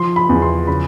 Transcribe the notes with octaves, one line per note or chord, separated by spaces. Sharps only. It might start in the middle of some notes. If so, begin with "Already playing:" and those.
Already playing: F3 C6
B5
E2
C6
C#3 B5